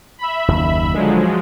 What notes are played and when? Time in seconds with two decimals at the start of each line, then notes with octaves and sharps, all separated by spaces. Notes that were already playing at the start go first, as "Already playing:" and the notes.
0.19 E5 B5
0.48 F#1 D#2
0.94 D3 F3 F#3 G#3